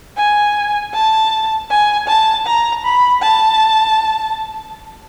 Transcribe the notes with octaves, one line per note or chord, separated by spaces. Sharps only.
G#5
A5
G#5
A5
A#5
B5
A5